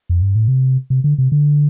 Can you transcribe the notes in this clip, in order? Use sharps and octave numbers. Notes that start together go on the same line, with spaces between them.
F2
G2
A2
C3
C3
D3
C3
D3